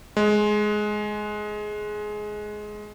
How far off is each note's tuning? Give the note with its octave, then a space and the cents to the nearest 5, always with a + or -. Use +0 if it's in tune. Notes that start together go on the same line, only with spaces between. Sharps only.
G#3 +15